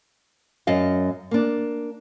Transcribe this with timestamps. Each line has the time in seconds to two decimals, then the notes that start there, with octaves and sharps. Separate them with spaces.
0.67 F#2 D#5 F5
1.31 A#3 D4